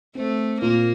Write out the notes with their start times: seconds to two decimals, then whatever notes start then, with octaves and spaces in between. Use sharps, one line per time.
0.15 A3 C4
0.61 A#2 A#3